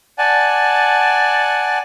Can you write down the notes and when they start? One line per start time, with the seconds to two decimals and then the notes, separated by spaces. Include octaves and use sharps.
0.18 D5 F#5 G#5 A5